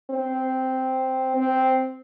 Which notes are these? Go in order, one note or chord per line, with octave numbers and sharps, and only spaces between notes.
C4
C4